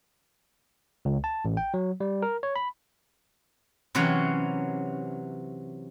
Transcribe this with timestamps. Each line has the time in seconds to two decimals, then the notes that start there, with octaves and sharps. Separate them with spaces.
1.05 C#2
1.24 A5
1.45 A1
1.57 G5
1.74 F#3
2.00 G3
2.22 A#4
2.43 C#5
2.56 B5
3.95 C3 E3 F#3 C#4